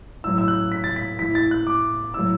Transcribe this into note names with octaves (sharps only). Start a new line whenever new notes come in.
A2 F#3 E6
E6
F#6
B6
A6
B6
A2 E3 B6
A6
F#6
D6
A2 F#3 E6